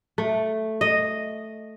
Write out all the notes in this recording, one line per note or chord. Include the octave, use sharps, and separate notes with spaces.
A3
D#5